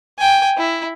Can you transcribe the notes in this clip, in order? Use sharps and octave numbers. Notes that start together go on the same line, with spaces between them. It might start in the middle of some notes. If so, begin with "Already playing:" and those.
G5 G#5
E4